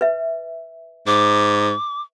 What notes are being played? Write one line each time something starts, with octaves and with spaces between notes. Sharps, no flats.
B4 E5
G#2 D6